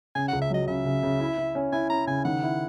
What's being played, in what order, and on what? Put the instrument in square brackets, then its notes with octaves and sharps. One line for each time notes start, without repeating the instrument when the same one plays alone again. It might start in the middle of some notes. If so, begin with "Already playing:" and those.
[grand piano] C#3 [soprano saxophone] G#5
[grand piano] C#2 [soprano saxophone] F#5
[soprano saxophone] E5
[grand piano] F#3 [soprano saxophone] D#5
[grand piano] C#3 [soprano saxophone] E5
[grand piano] C#3
C#3
E4
E4
C#4
[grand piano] E4 [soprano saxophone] G#5
[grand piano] C#4 [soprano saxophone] A#5
[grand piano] C#3 [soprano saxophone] G#5
[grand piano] D#3 [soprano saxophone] F#5
[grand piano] E4